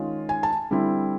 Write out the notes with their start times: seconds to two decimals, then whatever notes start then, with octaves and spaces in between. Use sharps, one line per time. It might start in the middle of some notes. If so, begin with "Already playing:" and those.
Already playing: D#3 G#3 C#4 F4
0.29 G#5
0.43 A5
0.71 D3 G3 C4 E4